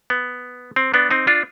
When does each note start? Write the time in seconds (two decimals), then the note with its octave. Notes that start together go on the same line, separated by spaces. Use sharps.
0.10 B3
0.76 C4
0.94 B3 D4
1.11 C4 D#4
1.27 D4 F4